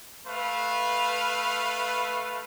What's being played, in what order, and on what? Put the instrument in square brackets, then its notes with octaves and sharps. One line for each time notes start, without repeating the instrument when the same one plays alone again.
[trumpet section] A3 B4 F5